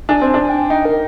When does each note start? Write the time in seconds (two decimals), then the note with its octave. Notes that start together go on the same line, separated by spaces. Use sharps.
0.09 D4 G#5
0.22 C4
0.29 G#5
0.34 D4
0.41 G#5
0.50 G5
0.70 D#4 G5
0.85 A#4